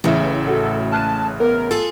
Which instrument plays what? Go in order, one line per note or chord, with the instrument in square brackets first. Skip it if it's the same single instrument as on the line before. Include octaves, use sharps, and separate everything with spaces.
[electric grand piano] A1 C#3 E5 [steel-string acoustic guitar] A2 C#4 [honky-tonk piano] E3
[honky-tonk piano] F#4 [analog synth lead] A4
[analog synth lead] A5 [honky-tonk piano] F6 F#6 D#7
[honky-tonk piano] B3 [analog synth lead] A#4
[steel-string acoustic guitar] F4 G#4 [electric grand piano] A4